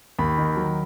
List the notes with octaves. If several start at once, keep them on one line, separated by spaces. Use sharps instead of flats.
D#2 B5
D#3
F#3